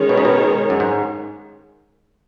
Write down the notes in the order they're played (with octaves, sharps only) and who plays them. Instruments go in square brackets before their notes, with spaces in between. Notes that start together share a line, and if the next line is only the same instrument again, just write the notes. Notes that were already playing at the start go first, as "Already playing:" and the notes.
Already playing: [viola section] D#3 G#3 C#4 G#4 C#5
[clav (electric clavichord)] B2
C#3
B2
F#2
G#2